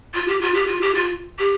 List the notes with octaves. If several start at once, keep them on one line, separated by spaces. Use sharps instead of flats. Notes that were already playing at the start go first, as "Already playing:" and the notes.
F4
G4
F4
G4
F4
G4
F4
G4